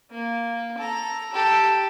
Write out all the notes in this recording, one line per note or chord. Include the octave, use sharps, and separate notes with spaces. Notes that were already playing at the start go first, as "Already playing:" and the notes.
A#3
A4 A#5
G4 A4